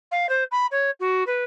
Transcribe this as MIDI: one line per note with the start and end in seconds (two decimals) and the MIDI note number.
0.11 0.29 77
0.29 0.44 72
0.51 0.66 83
0.71 0.90 73
1.00 1.23 66
1.27 1.44 71